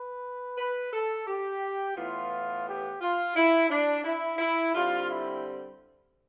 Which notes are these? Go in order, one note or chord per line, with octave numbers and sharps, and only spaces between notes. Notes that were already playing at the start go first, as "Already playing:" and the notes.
Already playing: B4
B4
A4
G4
A2 E3 B3 F4
G4
F4
E4
D4
E4
E4
D3 G3 C4 F4
E4